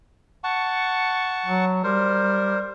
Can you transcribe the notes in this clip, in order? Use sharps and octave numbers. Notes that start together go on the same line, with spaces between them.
F#5 A5 C#6
F#3
G3 A#4 C5